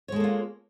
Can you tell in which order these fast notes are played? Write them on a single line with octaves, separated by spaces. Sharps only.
C#5 G#3 A4 A#3 F4